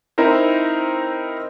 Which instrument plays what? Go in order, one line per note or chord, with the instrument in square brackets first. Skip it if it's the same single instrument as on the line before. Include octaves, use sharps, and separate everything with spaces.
[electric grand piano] C4 D#4 E4 A#4 C5